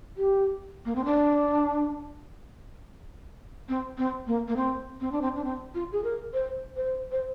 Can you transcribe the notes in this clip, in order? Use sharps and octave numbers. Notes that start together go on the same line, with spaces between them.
G4
A#3
C4
D4
C4
C4
A#3
A#3
C4
C4
D4
C4
D4
C4
F4
G#4
A#4
C5
C5
C5